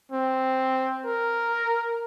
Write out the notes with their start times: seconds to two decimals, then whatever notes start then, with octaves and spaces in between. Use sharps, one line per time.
0.12 C4
1.05 A#4